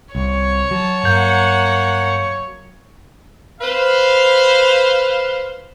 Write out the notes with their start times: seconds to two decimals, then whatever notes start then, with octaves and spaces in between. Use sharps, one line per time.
0.15 C2 C#5
0.71 F#3 A5
1.03 G2 A#3 F#5 G6
3.61 B4 C5 F5